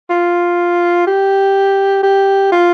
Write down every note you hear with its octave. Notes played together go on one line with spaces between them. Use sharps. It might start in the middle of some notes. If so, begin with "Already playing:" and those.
F4
G4
G4
F4